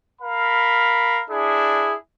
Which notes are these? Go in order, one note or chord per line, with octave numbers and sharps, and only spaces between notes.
A#4 F5 B5
D4 E4 G#4